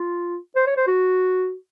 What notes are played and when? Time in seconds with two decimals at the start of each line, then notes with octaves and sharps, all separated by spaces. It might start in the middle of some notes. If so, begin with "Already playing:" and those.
Already playing: F4
0.56 C5
0.67 C#5
0.77 C5
0.87 F#4